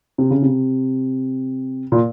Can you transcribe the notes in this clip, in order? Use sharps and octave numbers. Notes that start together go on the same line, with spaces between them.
C3
C#3
C3
A#2